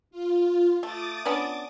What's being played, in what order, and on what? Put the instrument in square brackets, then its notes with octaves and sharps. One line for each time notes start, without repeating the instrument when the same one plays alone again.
[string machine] F4
[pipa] A3 [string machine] D6 D#6 A6
[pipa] B3 C#4 D4